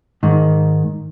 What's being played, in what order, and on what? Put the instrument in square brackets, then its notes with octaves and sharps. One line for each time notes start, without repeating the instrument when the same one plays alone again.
[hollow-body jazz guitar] G#2 D#3